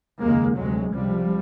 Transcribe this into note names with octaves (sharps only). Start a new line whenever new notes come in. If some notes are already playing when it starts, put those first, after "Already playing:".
F1 D#2 C#3 G#3 A#3
D2 C3 F#3 G#3
C#2 C3 F3 G3